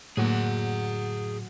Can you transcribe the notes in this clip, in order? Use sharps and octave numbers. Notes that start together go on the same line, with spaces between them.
A2 D3 F#3 A#3 G#4 F#5